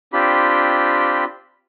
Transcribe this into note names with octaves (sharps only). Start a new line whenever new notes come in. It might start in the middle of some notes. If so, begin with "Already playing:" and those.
C4 D4 F4 G4 B5